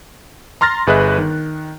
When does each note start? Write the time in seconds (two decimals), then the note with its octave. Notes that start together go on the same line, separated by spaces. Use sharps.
0.61 A#5 C6 F6 A6 A#6
0.87 G1 G#4 B4 D#5 E5 F#6
1.18 D#3